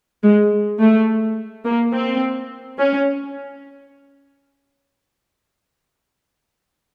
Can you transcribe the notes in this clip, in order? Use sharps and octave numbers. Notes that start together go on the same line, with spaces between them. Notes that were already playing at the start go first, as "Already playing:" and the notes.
G#3
A3
A#3
C4
C#4